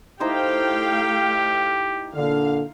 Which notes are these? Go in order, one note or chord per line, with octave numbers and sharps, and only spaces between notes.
A3 D#4 E4 G4 C5 F5 G5
A#2 D3 F5